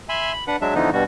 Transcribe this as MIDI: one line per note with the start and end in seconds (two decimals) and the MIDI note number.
0.09 0.33 76
0.09 0.33 80
0.09 0.33 83
0.09 0.33 84
0.33 0.44 83
0.47 0.56 62
0.47 0.56 71
0.47 0.56 78
0.61 0.74 54
0.61 0.74 56
0.61 0.74 62
0.61 0.74 76
0.74 0.90 50
0.74 0.90 52
0.74 0.90 53
0.74 0.90 59
0.74 0.90 63
0.93 1.04 43
0.93 1.04 47
0.93 1.04 55
0.93 1.04 66